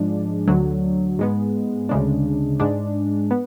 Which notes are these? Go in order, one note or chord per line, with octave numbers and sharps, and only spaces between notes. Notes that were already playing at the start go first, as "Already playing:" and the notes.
Already playing: G#2 F3 G#3 D4
D2 D3 F#3
G#2 G#3 B3
D2 C#3 G#3 D4
G#2 G#3 D4
B3